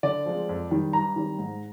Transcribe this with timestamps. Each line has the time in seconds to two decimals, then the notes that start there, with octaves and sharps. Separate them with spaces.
0.03 D3 D5
0.26 F3 G#3 C4
0.49 F2
0.71 D#3 G3
0.93 G2 A#5
1.16 D#3 G3 C4
1.38 G#2